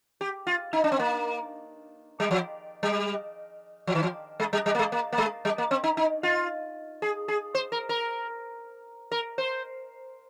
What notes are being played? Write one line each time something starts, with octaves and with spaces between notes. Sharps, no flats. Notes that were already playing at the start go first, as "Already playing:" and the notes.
G4
F4
D#4
D4
C4
A#3
G3
F3
G3
F3
D#3
F3
G#3
G3
G3
A#3
G#3
A#3
A#3
G#3
G3
A#3
C4
D#4
D#4
F4
G#4
G#4
C5
A#4
A#4
A#4
C5